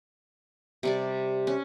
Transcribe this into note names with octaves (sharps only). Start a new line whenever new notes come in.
C3 G3 D5
C#4